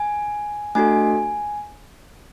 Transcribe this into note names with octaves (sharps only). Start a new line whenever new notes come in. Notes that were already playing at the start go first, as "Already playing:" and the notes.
Already playing: G#5
A3 D4 F#4 A4 G#5